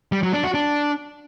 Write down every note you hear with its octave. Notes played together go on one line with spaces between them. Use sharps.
G3
F#3
D4
F#4
D4